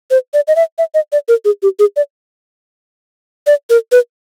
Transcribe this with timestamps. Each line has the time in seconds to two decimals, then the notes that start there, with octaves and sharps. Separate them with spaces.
0.11 C5
0.34 D5
0.48 D#5
0.56 E5
0.78 E5
0.94 D#5
1.12 D5
1.28 A#4
1.45 G#4
1.63 G4
1.79 G#4
1.96 D5
3.47 D5
3.70 A#4
3.92 B4